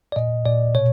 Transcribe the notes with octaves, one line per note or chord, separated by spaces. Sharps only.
D5
A#2 D#5
A#2 D5
B2 C#5